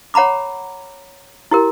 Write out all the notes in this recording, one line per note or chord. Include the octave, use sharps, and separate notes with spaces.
C#5 F#5 A#5 B5 D6
E4 G4 A#4